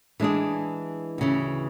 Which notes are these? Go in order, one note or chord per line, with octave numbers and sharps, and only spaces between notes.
E3 G#3 D4 G#4
D2 C#3 E3